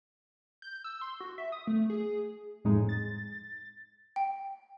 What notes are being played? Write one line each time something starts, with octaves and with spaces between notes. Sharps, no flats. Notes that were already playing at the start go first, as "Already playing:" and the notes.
G6
E6
C6
F#4
E5
D#6
A3
G#4
F2 A2 G#3 D#4
A6
G5